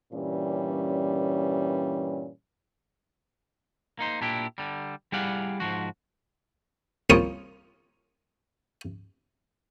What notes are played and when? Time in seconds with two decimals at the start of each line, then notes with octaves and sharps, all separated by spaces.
0.13 G2 A#2 E3 G3 C#4
3.99 A#3 D#4 C5
4.21 A#2 D4 E4 G4
4.58 D3 G3
5.12 G3 E4 G#4 D5 F5 F#5
5.60 G#2 F3 F#4
7.10 C2 A#3 F4 C#5 D#6